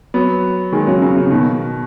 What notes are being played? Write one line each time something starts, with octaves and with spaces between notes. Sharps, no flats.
F#3 B3
D#3 G#3
C#3 F#3
C#3
C#3
B2 D#3